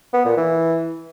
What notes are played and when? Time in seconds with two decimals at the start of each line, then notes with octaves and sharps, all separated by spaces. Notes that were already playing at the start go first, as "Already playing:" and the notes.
0.13 B3
0.25 A#2
0.37 E3